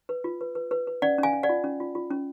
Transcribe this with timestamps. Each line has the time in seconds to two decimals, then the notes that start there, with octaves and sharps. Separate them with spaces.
0.09 B4
0.24 F4
0.41 B4
0.55 B4
0.71 B4
0.87 B4
1.02 C#4 D5 F#5
1.18 C#4 F5 G#5
1.33 C#4
1.43 D5 F#5
1.49 F4
1.64 C#4
1.80 F4
1.95 F4
2.10 C#4